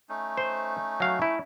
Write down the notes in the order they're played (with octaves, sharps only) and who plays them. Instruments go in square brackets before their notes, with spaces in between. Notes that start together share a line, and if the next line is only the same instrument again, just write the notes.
[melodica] A3 C#4 D#4
[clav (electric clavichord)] C5
F#3 F5
E4